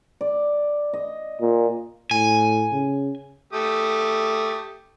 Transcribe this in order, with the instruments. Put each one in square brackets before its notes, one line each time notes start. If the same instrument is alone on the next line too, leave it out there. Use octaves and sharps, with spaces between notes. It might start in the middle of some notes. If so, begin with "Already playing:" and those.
[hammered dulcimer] D5
D#5
[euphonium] A#2
[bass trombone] A2 [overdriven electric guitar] G#5
[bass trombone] C#3
[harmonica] A3 G4 D#6